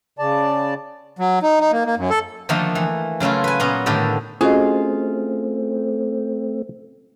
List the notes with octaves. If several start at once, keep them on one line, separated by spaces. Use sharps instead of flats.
C#3 D5 A5
F#3
D#4
D#4
A#3
A#3
F#2
A4
D3 D#3 F3 A3 A#3 D#4
E3
C#3 F#3 A3 E4 F4
B4 G#5
A#2 B3 C#4 A#5
A2 D3 D#3 G4 A4
A3 C4 C#4 F4 F#4 G#4 D#5